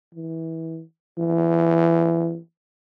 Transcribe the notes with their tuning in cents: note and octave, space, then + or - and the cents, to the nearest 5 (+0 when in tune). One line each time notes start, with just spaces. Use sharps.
E3 -20
E3 +20